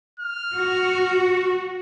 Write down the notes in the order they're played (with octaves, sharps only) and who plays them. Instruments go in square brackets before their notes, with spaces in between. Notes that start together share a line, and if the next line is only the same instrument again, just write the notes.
[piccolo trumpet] F6
[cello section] F#4